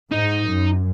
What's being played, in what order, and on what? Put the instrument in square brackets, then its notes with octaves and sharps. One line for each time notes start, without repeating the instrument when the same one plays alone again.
[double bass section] G#2 [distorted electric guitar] D#4
[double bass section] F#2